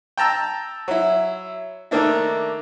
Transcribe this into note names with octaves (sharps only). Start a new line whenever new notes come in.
G5 A5 A#5 E6
F#3 E4
D#3 A3 A#3 D4 E4